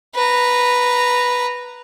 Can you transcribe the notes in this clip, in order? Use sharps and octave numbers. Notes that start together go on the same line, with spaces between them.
B4 A#5